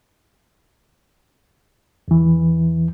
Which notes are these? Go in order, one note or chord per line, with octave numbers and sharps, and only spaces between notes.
E2 E3